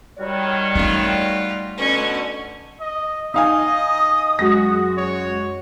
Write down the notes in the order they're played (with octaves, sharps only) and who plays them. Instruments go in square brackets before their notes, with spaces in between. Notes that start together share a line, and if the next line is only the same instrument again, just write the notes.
[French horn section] D#3 C#5 [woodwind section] G3 F#4
[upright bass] A3 D#4 [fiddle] F4 G4
[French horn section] B2 D3 [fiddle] C#4
[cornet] D#5
[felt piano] D#4 F5 G#5 [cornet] D#5 [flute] D#6
[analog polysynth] F#2 G#3 F#4 [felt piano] A#6
[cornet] C#5